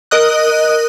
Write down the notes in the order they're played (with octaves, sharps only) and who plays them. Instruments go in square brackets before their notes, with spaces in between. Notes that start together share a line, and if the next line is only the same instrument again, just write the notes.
[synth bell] A#4 D#5 D#6 F#6